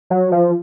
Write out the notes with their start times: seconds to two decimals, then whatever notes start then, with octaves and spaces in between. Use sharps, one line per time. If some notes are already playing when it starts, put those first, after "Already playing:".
0.10 F#3
0.32 F3